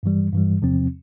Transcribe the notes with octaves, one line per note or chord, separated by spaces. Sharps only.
G2 E3 G3
G2 E3 G3
E2 C3 F3 C4